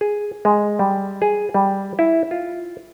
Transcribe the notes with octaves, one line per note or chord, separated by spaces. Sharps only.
G#4
G#3
G3
G#4
G3
E4
F4